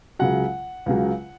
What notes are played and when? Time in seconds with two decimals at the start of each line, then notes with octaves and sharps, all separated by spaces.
0.19 C#2 C#3 F#3 F#5
0.86 C#2 C#3 F#3